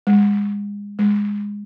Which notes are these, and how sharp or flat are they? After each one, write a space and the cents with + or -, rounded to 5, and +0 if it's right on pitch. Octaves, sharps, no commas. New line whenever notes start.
G#3 -30
G#3 -15